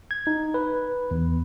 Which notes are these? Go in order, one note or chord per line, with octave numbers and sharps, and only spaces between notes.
G#6
D#4
B4
E2